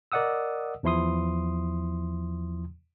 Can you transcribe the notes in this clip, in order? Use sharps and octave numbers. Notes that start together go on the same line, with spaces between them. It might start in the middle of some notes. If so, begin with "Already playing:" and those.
A#4 D5 D#5 F#5 D#6 E6
E2 F3 E4 C6 D#6